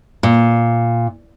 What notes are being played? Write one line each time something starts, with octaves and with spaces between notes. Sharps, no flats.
A#2